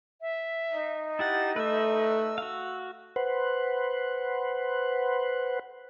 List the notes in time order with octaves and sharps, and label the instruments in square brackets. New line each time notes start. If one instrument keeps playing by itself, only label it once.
[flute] E5
[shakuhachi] D#4
[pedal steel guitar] E4 G4 F#5 [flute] A6
[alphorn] A3 [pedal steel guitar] B4 E5 [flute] E6
[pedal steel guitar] F#4 F5
[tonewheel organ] B4 C5 F#5